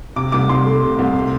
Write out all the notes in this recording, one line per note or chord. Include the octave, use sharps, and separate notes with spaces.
C3 D6
C2 D6
C2 C6
A3
C3
C2
C3